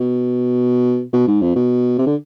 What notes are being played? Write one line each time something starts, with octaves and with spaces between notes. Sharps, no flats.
B2
B2
G#2
F2
B2
C3
D3